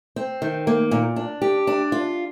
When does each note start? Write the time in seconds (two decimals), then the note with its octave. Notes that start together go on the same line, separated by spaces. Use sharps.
0.16 C4
0.42 D#3
0.67 A#3
0.91 A#2
1.16 D4
1.42 G4
1.67 D4
1.92 F4